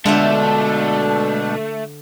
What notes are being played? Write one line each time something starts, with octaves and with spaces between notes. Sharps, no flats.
B2 D3 G#3 A3 D4 F4 E5